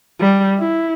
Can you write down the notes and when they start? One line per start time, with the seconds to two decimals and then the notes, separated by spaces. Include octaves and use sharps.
0.20 G3
0.58 E4